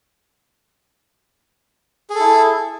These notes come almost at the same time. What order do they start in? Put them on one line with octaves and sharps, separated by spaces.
G#4 A4 E4